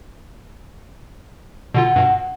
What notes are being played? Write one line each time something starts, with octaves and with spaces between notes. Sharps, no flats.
B2 D3 F4 F#5
G2 B2